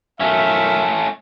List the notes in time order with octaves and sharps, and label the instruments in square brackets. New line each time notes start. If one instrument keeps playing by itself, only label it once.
[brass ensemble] B1 F#2 F5 [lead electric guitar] A3 C#4 [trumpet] E5